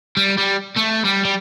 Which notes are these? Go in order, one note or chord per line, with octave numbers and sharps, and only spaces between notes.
G3
G3
A3
G3
G3